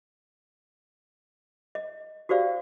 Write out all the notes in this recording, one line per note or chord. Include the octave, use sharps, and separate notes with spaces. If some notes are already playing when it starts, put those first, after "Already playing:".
D#5
F#4 G4 C5 D5 F5